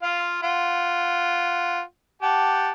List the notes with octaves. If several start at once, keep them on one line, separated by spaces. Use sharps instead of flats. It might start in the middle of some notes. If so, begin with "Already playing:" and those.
F4 F5
F4 F#5
G4 F#5 A5